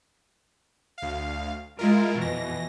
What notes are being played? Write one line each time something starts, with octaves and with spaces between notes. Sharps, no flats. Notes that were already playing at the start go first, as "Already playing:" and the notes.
D2 F5
G#3 E4 F4 A#4
F2 B2 E3 A#6